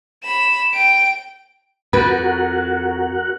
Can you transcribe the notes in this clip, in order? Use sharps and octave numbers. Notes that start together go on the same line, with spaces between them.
B5 E7
G5 D7
F2 F#4 A#4 B4 F#5